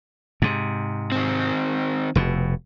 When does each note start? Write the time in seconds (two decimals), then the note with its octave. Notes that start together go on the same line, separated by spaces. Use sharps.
0.42 G#2 C3
1.12 D#3 C4
2.15 F1 B2